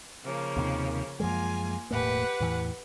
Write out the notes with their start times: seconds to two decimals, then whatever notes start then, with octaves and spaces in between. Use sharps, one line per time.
0.25 C#3 F3 A#3
0.57 D#2 C3 D#3
1.20 F#2 F3 G#3 A#3 F4 G#5
1.91 E1 A2 A#3 G4 B4 F#5
2.40 E2 A2 E3